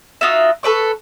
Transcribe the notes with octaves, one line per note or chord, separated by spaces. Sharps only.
D#4 F4 F#4 E5
A4 B4 D5 C#6